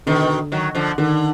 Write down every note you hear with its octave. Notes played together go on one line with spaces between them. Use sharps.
B2 D3 D#3
D#3 F#3
D3 F3
D3 D#3